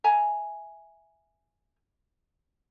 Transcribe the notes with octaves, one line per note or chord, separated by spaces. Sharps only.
E5 G#5 A#5